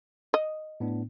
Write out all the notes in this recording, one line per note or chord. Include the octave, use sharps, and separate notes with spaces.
D#5
A2 B3 D4